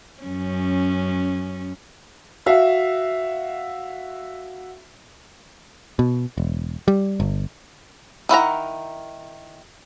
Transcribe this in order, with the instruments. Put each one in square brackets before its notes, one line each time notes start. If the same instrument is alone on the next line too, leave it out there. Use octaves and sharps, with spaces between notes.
[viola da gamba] F#2 C#4
[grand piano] F#4 E5 F5
[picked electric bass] B2
E1
G3
G1
[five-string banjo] D#3 E4 F#5 A#5